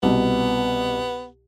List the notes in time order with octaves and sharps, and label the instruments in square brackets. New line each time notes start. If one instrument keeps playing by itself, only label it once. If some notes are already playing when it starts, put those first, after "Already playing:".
[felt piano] C2 B2 [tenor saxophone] B3